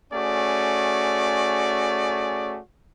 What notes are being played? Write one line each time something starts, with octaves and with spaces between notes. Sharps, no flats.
A3 C#4 F#4 G#4 D5